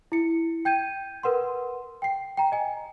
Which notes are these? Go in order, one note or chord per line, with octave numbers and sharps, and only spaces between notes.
E4 C#7
G5 G6 G#6 D#7
A#4 B4 F#5 C6
G5 C7
G5 A#5
D#5 G#5